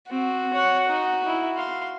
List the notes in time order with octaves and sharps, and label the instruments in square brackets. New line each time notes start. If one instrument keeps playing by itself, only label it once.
[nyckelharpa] C4 [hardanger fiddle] F#4
[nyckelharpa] C#5 F#5
D#4
D#4 E4
F5 C6